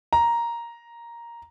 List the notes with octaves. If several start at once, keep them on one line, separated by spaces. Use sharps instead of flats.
A#5